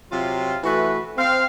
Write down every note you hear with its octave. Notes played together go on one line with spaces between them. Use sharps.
C3 F#3 F4
E3 A3 F#4 B4
C4 F5